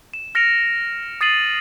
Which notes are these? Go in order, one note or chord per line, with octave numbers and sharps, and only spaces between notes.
E7
F6 A#6 C#7 D7 F7
D#6 A6 C7 D#7 F#7